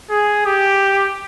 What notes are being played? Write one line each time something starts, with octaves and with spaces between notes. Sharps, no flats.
G#4
G4